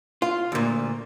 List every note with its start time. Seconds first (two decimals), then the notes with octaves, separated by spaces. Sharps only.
0.22 F4
0.52 D2 A#2